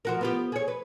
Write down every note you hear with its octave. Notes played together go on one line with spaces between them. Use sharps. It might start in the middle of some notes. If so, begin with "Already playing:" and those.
F3 F#4 A#4
B3 F4 G4
G#4 C#5
B4